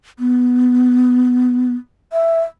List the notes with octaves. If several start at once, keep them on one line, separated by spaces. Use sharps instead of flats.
B3
E5